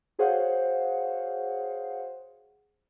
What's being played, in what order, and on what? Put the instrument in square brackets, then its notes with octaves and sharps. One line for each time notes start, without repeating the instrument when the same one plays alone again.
[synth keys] F#4 G#4 C5 C#5 F5 F#5